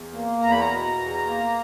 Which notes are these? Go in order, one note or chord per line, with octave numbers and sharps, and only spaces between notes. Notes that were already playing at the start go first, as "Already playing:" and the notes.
Already playing: E2
A#3
E2 A#5
B5
A#5
B2
E2
A#3